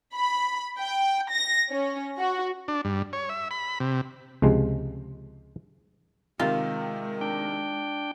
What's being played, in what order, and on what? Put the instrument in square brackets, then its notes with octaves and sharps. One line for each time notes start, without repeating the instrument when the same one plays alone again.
[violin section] B5
G5
A#6
C#4
F#4
[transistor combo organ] D4
G2
C#5
E5
B5
C3
[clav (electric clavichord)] C#2 C3 F3 G#3
[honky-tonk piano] C3 D#3 [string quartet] G#3 [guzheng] F4
[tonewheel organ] D4 G5